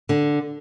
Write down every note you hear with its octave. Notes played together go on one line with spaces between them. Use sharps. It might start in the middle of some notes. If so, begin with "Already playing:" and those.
D3